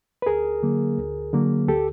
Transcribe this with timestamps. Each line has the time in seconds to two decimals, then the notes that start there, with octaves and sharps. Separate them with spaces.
0.22 B4
0.26 D2 G#4 A#4
0.63 D3 F#3 A#3
0.97 D2
1.33 D3 F#3 A#3
1.68 D2 G4 A4